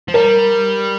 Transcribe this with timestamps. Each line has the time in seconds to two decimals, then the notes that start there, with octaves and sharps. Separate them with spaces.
0.08 F3
0.14 G3 A#4